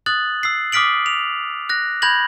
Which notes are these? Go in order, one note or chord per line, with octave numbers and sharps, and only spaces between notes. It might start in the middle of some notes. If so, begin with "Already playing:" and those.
D#6 F#6 A6 F#7
E6 C7
D6 D#6 F6 B6 D7 F#7
F7
F#6 A#6
B5 G6 G#6 A#6 F#7